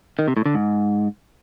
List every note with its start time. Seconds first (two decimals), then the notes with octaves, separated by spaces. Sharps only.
0.19 D#3
0.28 C3
0.37 A2
0.46 D3
0.54 G#2